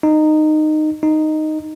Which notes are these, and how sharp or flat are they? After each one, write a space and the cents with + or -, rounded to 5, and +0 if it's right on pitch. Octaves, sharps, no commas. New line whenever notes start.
D#4 -15
D#4 -5